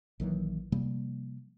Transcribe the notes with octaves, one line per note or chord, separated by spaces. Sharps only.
A#1 D#3 E3 F#3
C3 F3 G3 A#3